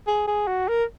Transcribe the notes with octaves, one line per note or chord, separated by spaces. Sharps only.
G#4
G#4
F#4
A#4